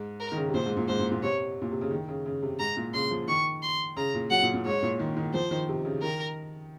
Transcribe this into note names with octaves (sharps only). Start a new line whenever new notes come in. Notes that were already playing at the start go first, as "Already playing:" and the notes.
Already playing: G#2
A#4
D#3
C#3
C3
A#2 C5
G#2
A#2
G#2 C5
A#2
A#2
C3 C#5
A#2
C3
C#3
D#3
C#3
C#3
C3
G#2 A#5
A#2
C#3 C6
F3
D#3 C#6
C6
C#3 A#5
A#2
F#3 F#5
A#2
A#2
G#2 C#5
A#2
D#3
D#3
F3 C5
D#3
C3
C#3
D#3 A#4